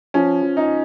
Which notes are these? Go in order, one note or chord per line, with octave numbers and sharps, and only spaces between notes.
F3 C#4
F3
D#4